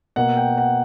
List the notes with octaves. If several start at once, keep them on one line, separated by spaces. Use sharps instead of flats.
B2 A#3 F#5
G5
F#5